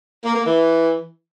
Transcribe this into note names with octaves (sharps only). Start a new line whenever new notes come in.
A#3
A#3
E3